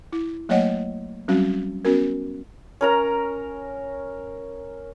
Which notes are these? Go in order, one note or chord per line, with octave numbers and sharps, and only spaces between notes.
E4
F#3 A3 A#3 C#5 D#5 F#5
F#3 G3 C4 C#4 F#4
B3 C#4 F#4 A#4
C#4 A#4 A#5